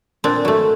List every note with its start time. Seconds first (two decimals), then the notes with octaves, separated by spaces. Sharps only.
0.24 A#2 C4 D4
0.45 F#3 A3